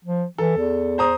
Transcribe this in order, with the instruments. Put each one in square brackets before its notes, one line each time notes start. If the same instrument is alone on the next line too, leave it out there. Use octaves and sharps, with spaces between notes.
[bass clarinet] F3
[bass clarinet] E3 [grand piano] A4
[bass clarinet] E2
[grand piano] C5 A#5 D#6